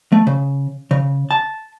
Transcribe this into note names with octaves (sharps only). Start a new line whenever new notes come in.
A3
C#3
C#3
A5